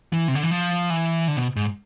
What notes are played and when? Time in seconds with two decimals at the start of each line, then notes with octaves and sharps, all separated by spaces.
0.13 E3
0.28 C3
0.35 D3
0.43 E3
0.51 F3
0.90 E3
1.28 D3
1.37 B2
1.56 G#2